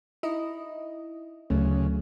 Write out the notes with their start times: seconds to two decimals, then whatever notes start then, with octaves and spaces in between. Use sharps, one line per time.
0.23 D#4 E4 D#5
1.50 D2 C#3 F#3 A3